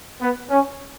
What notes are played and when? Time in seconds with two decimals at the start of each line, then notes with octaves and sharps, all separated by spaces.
0.21 B3
0.50 C#4